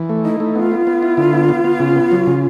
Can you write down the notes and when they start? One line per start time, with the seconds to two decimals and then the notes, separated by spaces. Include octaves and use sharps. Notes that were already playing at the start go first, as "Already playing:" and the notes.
Already playing: E3
0.09 A3
0.25 D#4 E4
0.40 A3
0.55 B3 F4
0.72 B3
0.87 B3
1.03 E4
1.17 D3
1.33 B3
1.49 B3
1.64 B3
1.80 C#3
1.96 B3
2.12 F#3
2.27 C#3